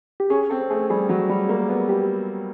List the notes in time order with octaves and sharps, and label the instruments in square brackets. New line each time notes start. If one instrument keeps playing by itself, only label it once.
[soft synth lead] G4
[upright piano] C#4 [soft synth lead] G#4
[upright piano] C4 [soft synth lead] A4
[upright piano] A3 [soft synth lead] G#4
[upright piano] G3 [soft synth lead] G#4
[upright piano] F#3
G3
A#3
B3
[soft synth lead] G4